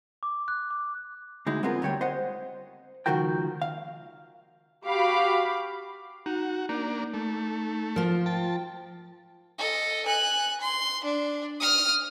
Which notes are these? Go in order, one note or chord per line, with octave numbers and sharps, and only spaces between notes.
D6
F#6
D6
D2 G#3 D#4 E4
G#3 B3 C4 F4 G#4 A#4
D2 G3 C#5 G5
C5 D#5 F#5
C#2 D#3 F3 F#4 A#4 G5
F5
F#4 G4 F5 B5 D6
D#4 F#4
A#3 D4 D#4
A3
F3 F4 A#4
G5 A5
A4 D#5
G#5 F#6
C6
D4
D#6 F6